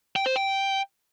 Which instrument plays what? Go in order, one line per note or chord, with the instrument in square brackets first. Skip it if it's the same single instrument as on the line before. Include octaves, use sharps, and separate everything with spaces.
[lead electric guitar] G5
C5
G5